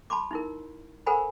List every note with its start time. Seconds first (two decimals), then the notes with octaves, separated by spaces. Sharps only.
0.10 A5 B5 C6 D6
0.31 D#4 E4 A#4
1.06 A4 A#4 C5 F#5 G#5 B5